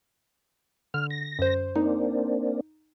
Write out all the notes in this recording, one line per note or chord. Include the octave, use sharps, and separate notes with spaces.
D3 F6
A#6
F#2 C5
A#3 C4 D4 D#4